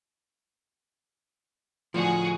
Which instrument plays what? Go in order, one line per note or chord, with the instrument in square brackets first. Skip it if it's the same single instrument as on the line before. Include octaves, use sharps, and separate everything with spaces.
[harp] A2 D3 [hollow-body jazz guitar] F3 [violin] F#4 G#4